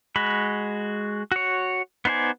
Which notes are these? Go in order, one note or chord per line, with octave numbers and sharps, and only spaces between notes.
G#3 F#4 B5
F#4 C#5
B3 D#4 C5 D5 G#5